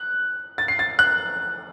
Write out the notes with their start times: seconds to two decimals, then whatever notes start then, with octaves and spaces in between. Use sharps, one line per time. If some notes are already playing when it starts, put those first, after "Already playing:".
Already playing: F#6
0.58 A6
0.68 C7
0.79 A6
0.99 F#6